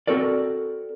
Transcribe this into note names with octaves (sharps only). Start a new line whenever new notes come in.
C4 F#4 A4 A#4 D5